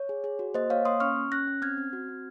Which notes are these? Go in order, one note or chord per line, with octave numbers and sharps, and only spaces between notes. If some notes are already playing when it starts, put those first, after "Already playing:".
Already playing: C#5
G#4
G#4
F#4
A#3 C5 D#5
A#3 C#5 F5
A#3 C6 D#6
C#4 C#6 F6
C#4
C#4 F#6 A#6
C#4
C4 F6 G#6
C4
F#4
C4